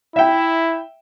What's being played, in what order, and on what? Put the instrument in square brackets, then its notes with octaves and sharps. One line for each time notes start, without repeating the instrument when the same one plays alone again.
[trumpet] E4 [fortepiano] E5 G5